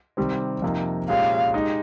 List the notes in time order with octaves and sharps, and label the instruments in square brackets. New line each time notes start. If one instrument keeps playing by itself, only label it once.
[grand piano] C3 D#3 G3 C4
F2 C3 F3 A#3 D#4
[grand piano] A#2 G#3 C#4 G4 [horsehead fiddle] F5
[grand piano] G#3 D#4 G4